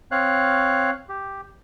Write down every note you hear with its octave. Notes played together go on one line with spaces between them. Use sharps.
C4 C#5 F5 F#6
G4